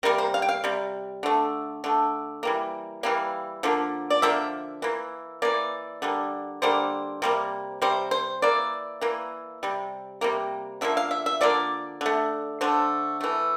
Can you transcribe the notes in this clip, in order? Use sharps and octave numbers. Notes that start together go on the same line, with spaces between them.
C3 G3 A#3 A#4
C5
F5
G5
F5
C3 G3
D3 A3
D3 A3
E3 G3 A#3
E3 G3 A#3 F5
D3 F3 A#3
D5
D3 F3 A#3 E5
E3 A#3
E3 A#3 D5
D3 G3 A#3
D3 G3 A#3 C5
C3 G3 A#3
C3 G3 C5
C5
E3 A#3 D5
E3 A#3
C3 G3
C3 G3 A#3
D3 F3 A#3 E5
F5
E5
E5
D3 F3 A#3 D5
D3 A3
D3 A3 C5
E3 A3